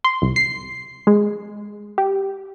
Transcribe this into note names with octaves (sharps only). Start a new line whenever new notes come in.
C6
C2
C7
G#3
G4